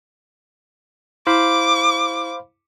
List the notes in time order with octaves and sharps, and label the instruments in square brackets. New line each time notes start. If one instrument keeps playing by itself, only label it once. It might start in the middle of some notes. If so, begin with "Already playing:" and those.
[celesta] E4 [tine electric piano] C5 F5 B5 [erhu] D6